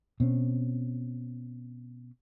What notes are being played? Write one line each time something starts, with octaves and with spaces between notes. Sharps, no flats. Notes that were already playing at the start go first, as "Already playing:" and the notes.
B2 C4 C#4